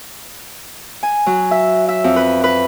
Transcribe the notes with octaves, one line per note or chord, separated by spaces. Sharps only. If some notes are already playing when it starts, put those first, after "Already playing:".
G#5
F#3
E5
E5
F2
B4
B4